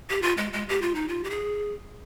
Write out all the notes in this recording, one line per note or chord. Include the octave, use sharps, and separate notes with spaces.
G4
F4
G#3
G#3
G4
F4
D#4
F4
G4
G#4